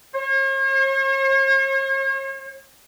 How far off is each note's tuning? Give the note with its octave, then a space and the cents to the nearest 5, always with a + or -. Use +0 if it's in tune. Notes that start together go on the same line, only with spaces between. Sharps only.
C#5 -45